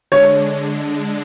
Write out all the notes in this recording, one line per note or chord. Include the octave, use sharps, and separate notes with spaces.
D3 G#3 D4 C#5